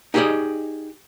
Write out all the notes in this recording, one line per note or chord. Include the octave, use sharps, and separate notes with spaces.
D#4 G4 G#4 B4 D5 D#5